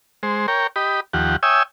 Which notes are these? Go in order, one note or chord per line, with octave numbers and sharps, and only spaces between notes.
G#3 C5
A#4 C#5 G5
G4 D#5 B5
D#2 F3 G4 F#5
C#5 E5 G5 G#5 D#6 E6